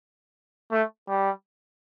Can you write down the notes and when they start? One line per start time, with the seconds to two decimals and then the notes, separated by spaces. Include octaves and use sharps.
0.72 A3
1.09 G3